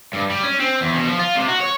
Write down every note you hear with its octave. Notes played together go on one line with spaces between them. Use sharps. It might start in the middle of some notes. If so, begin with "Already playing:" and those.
G2
G3
C#4
C4
E2
B2
F3
F4
C3
F#4
C#5